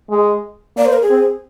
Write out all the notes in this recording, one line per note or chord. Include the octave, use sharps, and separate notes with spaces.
G#3
A#3 D5
C5
A#4
G#4
C4